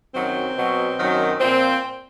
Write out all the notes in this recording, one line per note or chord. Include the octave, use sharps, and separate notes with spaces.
F#2 D#3 F#3 C4
B2 F#3
F#2 D#3 F#3
A#2 F3 C4